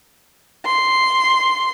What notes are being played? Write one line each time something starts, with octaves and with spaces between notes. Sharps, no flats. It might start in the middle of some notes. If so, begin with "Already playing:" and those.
C6